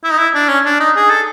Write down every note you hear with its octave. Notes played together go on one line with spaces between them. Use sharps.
E4
D#4
E4
D4
C#4
D4
D#4
G#4
A4